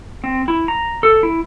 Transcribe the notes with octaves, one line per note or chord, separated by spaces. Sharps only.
C4
E4
A#5
A4
E4